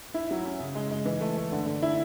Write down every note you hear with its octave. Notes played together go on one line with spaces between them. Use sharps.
E4
F#3
C#4
C#3
G#3
G#3
E3
A3
A3
D3
D3
E4